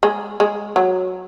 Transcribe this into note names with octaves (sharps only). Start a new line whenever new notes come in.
G#3
G#3
F#3